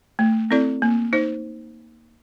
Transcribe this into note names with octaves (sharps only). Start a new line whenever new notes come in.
A3
C4 E4 A4 D5
A#3
D#4 C5